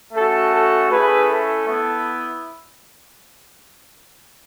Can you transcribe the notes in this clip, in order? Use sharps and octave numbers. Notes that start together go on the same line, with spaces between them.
A3 C#4 F#4 A4
A4
A3 C#4 E4 G#4 B4
A4
B3 E4